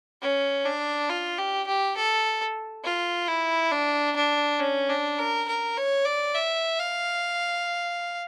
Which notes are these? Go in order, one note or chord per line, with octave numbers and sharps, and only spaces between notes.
C#4
D4
F4
G4
G4
A4
F4
E4
D4
D4
C#4
D4
A#4
A#4
C#5
D5
E5
F5